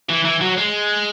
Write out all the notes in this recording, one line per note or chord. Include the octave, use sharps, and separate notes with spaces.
E3
E3
F#3
G#3